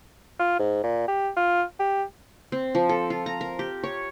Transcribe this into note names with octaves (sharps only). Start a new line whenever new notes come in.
F4
G#2
A#2
G4
F4
G4
C4
F3
A4
F4
A#5
A#4
G4
C#5